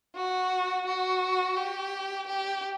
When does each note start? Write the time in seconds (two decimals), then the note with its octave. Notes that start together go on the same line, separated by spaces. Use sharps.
0.15 F#4
0.87 F#4
1.56 G4
2.27 G4